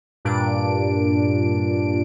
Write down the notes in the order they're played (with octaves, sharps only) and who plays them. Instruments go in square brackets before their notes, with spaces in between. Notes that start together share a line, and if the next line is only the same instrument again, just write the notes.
[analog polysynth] G2 A#2 D4 D7